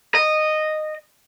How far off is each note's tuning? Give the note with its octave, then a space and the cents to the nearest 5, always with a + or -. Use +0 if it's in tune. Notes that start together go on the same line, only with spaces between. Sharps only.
D#5 -10